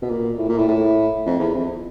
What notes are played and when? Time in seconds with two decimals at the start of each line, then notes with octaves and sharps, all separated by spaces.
0.02 B2
0.10 A#2
0.38 A2
0.49 A#2
0.58 A2
0.68 A2
1.26 F2
1.40 E2
1.54 F2